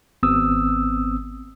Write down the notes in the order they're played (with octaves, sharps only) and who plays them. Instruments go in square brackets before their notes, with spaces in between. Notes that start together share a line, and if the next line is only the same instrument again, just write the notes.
[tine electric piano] G#1 B3 C4 D#6 E6